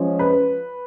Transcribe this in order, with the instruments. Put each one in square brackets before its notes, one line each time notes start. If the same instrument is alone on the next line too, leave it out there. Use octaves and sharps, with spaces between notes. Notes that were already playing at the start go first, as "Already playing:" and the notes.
Already playing: [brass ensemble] F3 G#3 C#4
[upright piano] B4